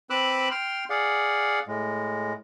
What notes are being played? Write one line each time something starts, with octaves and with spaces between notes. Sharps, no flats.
C4 B4 B5 D6 E6 F#6
G5 C6 F6
G#4 D5 F5 F#5
A2 G#3